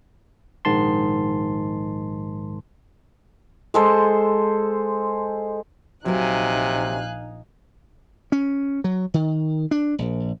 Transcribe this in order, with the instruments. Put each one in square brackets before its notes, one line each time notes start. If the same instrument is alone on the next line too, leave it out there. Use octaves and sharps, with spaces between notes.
[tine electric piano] A#1 G#2 D#3 A5 C6
[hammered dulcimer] G#3 A4 C5
[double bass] A#1 D#4 [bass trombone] C3 [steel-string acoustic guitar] F#3 A#4 [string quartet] F5 G#5 F#6
[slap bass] C#4
F#3
D#3
D4
A#1